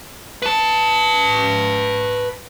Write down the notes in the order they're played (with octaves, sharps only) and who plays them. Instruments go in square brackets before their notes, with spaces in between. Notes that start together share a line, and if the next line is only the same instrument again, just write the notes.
[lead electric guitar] B4 A5